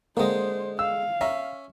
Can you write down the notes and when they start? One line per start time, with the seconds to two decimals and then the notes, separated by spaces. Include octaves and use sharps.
0.17 D3 G#3 A#3 C4 C5 D#5
0.79 F5 E6
1.21 C#4 E5 A#5